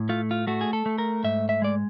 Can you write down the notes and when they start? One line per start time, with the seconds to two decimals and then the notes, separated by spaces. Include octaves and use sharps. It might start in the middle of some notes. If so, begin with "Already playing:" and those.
Already playing: A2
0.09 A3 F4
0.31 F4
0.47 A3 F#4
0.61 G#4
0.73 A4
0.86 A3
0.98 A#4
1.24 G#2 E5
1.49 E5
1.62 G#3 D5